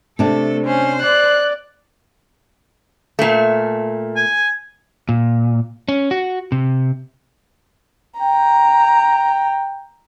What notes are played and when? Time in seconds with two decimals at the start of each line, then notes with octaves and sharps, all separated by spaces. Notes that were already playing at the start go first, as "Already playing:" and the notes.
0.19 C3 A3 D4 A4
0.66 C#4 C5
1.01 D5 F#6
3.19 A#2 A3
4.16 G#5
5.09 A#2
5.88 C#4
6.11 F#4
6.52 C3
8.19 G5 A#5